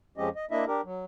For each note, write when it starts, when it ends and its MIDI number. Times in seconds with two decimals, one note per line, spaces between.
0.18 0.29 41
0.18 0.29 53
0.18 0.29 56
0.18 0.29 61
0.18 0.29 67
0.18 0.29 75
0.36 0.45 75
0.51 0.65 58
0.51 0.65 62
0.51 0.65 64
0.51 0.65 75
0.51 0.65 76
0.67 0.81 62
0.67 0.81 67
0.67 0.81 70
0.85 1.05 54